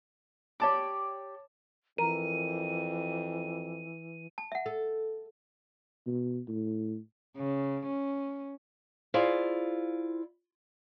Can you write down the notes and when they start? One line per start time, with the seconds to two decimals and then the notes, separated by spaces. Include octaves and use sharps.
0.60 G4 C#5 D5 A5 D6
1.98 F2 E3 A#4 D#7
4.38 A5
4.52 E5 F#5
4.66 A4
6.07 B2
6.48 A2
7.37 C#3
7.87 C#4
9.14 E4 F4 G#4 C5 D5 F5